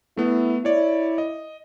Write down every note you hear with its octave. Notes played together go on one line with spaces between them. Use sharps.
A3 B3 E4
E4 C#5 D5
D#5